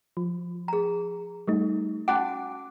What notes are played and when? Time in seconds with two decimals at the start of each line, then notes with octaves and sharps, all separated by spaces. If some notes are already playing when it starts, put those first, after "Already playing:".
0.17 F3
0.68 G#4 A#5
1.48 G3 A3 D#4
2.08 C#4 F#4 F#5 A5 D6